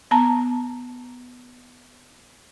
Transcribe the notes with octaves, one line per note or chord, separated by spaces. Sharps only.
B3 A5 A#5